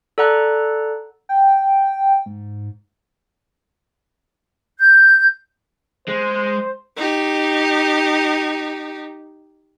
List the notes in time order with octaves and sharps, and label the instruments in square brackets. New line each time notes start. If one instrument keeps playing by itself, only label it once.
[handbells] A4 D5 F#5 A#5 F#6
[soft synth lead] G5
G#2
[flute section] G6
[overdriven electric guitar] G#3 [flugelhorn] C5
[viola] D#4 G4